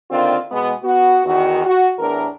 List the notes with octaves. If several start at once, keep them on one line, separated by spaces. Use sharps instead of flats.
D3 D#3 A#3 C4 D4 F4
B2 G#3 B3
B3 F#4
E2 D#3 F#4
F#4
E2 A2 E3 D4 A#4